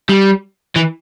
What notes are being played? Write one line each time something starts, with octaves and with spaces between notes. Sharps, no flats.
G3
E3